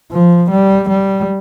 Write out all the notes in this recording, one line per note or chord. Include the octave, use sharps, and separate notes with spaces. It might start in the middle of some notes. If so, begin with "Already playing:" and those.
F3
G3
G3